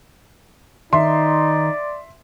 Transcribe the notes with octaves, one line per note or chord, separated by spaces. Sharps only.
D#3 D#4 D5 E5 C6